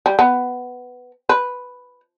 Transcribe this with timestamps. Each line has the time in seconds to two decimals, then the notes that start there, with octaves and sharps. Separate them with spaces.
0.06 G3
0.19 B3
1.29 B4